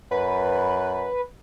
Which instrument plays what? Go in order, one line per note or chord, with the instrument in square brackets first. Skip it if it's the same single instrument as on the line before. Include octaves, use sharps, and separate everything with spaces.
[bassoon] F#2 [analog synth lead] B4